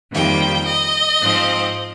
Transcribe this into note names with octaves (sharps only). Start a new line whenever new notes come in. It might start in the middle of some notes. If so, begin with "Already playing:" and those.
F2 D#3 G3 A#3 G5
D#5
G#2 F3 C4